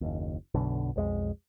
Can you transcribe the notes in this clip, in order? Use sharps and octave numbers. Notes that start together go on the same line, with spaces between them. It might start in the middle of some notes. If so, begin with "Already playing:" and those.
F#1 D#2
B1 F#2 B2 D3
B1 F2 G#3